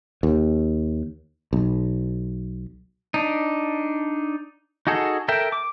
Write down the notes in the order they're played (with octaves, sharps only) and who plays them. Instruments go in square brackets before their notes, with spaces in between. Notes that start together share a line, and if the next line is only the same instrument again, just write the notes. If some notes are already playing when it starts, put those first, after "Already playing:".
[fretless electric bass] D#2
B1
[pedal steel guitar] D4 D#4
D#4 F#4 G#4 A4
A4 A#4 E5 G5
D6